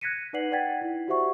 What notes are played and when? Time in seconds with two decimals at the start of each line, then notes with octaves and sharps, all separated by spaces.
0.01 F#6 G#6 A#6 B6 C#7 D#7
0.33 D#4 B4 D5 F#5 C7 F#7
0.52 D5 F#5 G5 G#6 A6 B6
0.81 E4
1.08 F#4 G4 C5 E5 F#5 C#6